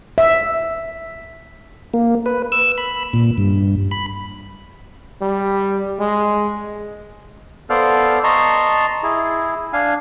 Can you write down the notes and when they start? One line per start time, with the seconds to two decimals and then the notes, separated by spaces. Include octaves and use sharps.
0.18 E5
1.94 A#3
2.26 B4
2.52 E6
2.78 B5
3.13 A#2
3.38 G2
3.91 B5
5.21 G3
6.00 G#3
7.70 B3 A4 C5 D5 F5 F6
8.24 D#5 A5 A#5 C6 C#6
9.03 E4 G#4
9.73 D4 F5 G#5